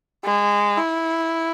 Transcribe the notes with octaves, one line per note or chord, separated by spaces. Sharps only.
G#3
E4